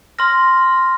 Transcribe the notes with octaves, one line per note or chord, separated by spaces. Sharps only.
C6 F6 A#6